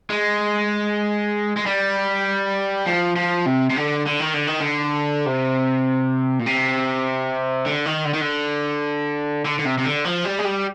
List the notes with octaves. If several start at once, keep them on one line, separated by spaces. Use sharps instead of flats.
G#3
G#3
G3
F3
F3
C3
C3
D3
D3
D#3
D3
D#3
D3
C3
A#2
C3
D3
D#3
D3
D#3
D3
D3
D3
C3
C3
D3
F3
G3
G#3
G3